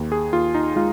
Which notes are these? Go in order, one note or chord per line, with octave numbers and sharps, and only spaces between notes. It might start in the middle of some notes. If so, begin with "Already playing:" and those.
Already playing: D#2
G#4
D#2 F4
D#4
G#3 F4